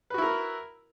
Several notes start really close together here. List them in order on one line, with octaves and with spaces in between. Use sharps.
B4 F#4 E4 A#4